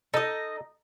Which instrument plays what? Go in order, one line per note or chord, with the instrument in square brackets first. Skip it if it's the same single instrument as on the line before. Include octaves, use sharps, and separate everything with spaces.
[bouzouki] D#4 D#5 [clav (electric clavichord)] A4